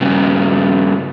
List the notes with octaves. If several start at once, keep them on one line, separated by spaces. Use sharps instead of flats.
G2 C#3